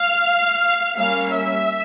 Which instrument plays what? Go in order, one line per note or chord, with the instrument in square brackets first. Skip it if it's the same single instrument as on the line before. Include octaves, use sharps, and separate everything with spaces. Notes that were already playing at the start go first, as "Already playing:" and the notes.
Already playing: [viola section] F5
G3 A#3 C#4 F5
E5